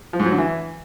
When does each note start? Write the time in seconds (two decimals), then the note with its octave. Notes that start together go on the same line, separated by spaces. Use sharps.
0.13 F3
0.20 G#2
0.26 F#3
0.32 D3
0.38 E3